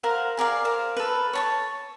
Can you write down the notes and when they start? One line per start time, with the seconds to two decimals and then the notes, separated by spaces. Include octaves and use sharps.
0.03 A#4 C5 F5 F#5
0.37 G#4 A#4 D5 F5
0.65 A#4 C5 F5
0.97 A4 B4
1.33 C#5 A5 C#6